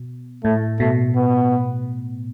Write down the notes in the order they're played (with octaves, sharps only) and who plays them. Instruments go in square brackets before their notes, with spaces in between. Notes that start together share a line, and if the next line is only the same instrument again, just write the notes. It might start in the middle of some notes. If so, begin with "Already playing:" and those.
Already playing: [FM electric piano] B2
[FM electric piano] A2 [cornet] A3
[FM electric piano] B2 [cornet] A3
[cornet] B3